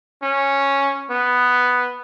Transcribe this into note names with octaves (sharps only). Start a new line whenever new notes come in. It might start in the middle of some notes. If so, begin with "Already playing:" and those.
C#4
B3